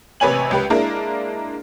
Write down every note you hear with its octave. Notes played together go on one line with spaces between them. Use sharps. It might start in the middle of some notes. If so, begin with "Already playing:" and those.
A1 C3 B4 C#5 G#5 F#7
C#2 G4 B4
G#3 A#3 D4 E4 A#4